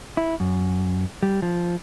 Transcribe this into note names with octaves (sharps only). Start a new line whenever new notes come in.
E4
F#2
G3
F3